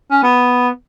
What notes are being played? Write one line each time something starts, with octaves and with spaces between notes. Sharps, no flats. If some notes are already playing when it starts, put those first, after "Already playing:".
C#4
B3